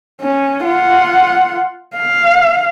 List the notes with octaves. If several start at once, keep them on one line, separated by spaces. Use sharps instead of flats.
C#4
F4 F#5
F5